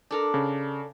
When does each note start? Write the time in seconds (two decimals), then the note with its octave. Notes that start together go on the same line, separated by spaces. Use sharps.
0.11 D4 A4 A#4
0.34 C#3